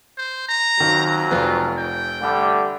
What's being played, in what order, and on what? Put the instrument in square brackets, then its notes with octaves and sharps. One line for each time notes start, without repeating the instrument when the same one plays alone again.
[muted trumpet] C5
A#5
[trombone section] F2 F#3 [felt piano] D#3
[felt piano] F1 F3 B4 [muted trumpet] F4
[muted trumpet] G5
[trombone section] D3 G3 A3